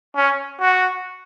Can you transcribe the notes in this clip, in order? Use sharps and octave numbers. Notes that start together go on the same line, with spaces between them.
C#4
F#4